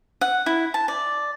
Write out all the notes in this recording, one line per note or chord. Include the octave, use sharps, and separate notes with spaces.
F#5
E4
A5
D5